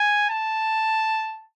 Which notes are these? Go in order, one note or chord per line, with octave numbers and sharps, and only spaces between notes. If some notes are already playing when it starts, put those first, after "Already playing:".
Already playing: G#5
A5